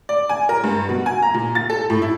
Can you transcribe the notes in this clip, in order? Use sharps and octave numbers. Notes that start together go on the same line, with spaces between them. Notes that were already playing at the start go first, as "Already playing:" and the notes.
D5
G#5
A#4
G2
B2
G#5
A#5
A#2
A6
A4
A2
E4